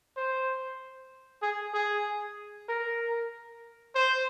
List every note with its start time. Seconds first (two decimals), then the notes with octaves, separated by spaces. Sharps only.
0.17 C5
1.42 G#4
1.74 G#4
2.69 A#4
3.95 C5